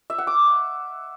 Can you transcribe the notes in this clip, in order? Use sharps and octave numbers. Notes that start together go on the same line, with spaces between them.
E5
F#5
D6